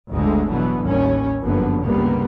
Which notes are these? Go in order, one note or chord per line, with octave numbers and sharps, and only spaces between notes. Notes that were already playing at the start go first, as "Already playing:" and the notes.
G1 D2 G#2 D3 G#3 A3
B2 D3 E3 F#3 B3
A1 D#2 G3 C#4
G1 F#2 D3 F3 A#3 B3
G1 C#2 C3 G3 A#3 B3